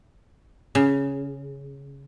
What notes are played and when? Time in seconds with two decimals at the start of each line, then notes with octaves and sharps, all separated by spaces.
0.75 C#3